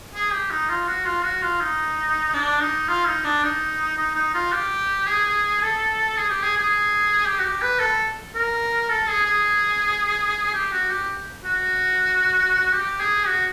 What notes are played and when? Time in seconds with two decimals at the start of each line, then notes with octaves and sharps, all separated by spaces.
0.15 G#4
0.32 G4
0.51 D#4
0.69 F4
0.88 F#4
1.06 F4
1.24 F#4
1.42 F4
1.60 D#4
2.34 D4
2.61 D#4
2.88 F4
3.06 D#4
3.24 D4
3.43 D#4
3.98 D#4
4.15 D#4
4.34 F4
4.52 G4
5.07 G#4
5.62 A4
6.17 G#4
6.30 G4
6.43 G#4
6.57 G#4
7.25 G4
7.39 F#4
7.44 G4
7.62 B4
7.80 A4
8.35 A#4
8.90 A4
9.08 G#4
9.26 G#4
10.54 G4
10.72 F#4
10.90 G4
11.45 F#4
12.73 G4
13.00 G#4
13.27 F#4